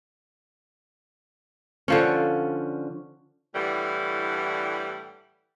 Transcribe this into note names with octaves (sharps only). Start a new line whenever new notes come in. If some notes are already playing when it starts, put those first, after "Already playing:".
D3 F3 C#4
A2 D3 E3 G3